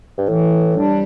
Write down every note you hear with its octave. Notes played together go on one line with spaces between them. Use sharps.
G2
A2 E3
G3 D4